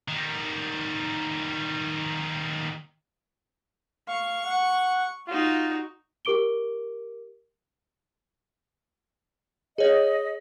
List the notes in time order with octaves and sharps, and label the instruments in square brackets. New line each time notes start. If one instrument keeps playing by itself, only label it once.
[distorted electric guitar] D#3 G3
[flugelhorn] F5 [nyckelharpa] C#6
[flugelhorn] F#5
[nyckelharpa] D#4 F#4 [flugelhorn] F4
[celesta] G4 A#4 D6 D7 G7
[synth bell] G#4 C#5 [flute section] D#5